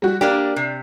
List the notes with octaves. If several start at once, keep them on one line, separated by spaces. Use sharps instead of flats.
G3 F#4
A#3 D4 G4 D5
C3